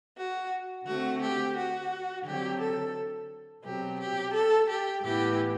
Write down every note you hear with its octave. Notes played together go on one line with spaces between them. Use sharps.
F#4
D3 A3 C4 F#4
G4
F#4
D3 F#3 C4 G4
A4
B2 F#3 C4 G4
G4
A4
G4
A2 E3 B3 G4